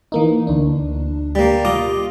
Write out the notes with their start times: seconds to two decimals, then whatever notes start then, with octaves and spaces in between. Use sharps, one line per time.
0.12 E3 A#3 D#4
0.47 D2 D4
1.35 G3 A#3
1.65 F4 D#5 D6